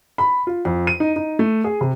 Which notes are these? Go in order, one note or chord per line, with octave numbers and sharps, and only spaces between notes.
B5
F4
F2
D#7
D#4
D#4
A3
G#4
C3